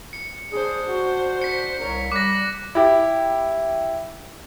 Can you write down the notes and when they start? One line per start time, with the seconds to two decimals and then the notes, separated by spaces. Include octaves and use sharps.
0.13 C#7
0.52 D4 G#4 C5
0.88 F#4
1.42 B6 C#7
1.80 C2 A#4 C#5
2.12 G3 D6 F#6 A#6
2.75 E4 G4